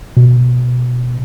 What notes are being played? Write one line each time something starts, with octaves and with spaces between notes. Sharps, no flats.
B2